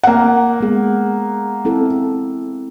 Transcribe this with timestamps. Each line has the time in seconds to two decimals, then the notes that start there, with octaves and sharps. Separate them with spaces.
0.04 A#3 F#5
0.61 G#3 B3 G#4
1.65 C4 E4 A4